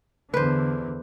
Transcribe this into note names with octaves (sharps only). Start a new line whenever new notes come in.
E2 D3 B4 C5